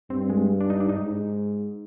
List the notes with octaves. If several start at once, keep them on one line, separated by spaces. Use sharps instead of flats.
G2 C4
G#3
D4
D#4
D4
G#2 D#4